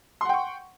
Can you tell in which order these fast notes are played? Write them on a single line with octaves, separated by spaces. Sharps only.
C6 F#5 G5 C#6